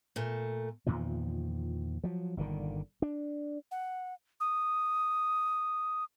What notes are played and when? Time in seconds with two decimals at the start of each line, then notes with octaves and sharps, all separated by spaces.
0.16 A#2 A3
0.86 E2 A#2 D#3 F3
2.04 F3 F#3
2.37 G1 A#2 D3 D#3
3.02 D4
3.71 F#5
4.40 D#6